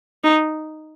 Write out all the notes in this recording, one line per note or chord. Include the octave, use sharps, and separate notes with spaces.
D#4